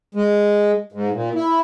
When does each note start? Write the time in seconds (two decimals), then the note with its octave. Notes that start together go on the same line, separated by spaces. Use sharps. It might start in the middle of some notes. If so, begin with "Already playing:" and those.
0.14 G#3
0.92 G#2
1.12 A#2
1.34 E4